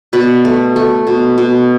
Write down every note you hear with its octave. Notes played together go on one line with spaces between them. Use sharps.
B2 B4 D5
A3
A3
B2
B2